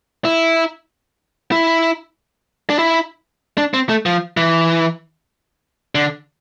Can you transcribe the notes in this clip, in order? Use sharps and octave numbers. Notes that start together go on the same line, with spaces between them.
E4
E4
D4
E4
D4
C4
A3
F3
E3
D3